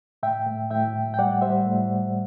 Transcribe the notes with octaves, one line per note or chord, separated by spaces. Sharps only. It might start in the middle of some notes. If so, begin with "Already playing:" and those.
A2 E5 G5
A2
A2 E5 G5
A2
G5
G3 D5 F#5
G3 C5 E5
A2